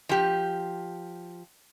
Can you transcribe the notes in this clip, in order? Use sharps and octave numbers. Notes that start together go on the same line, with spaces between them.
F3 G4